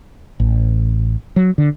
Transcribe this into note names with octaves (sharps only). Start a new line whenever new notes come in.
A1
F#3
D3